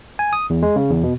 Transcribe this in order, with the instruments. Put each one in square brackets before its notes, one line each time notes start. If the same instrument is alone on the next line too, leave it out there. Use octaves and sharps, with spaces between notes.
[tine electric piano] G#5
D#6
E2
G#3
C#3
E2
B2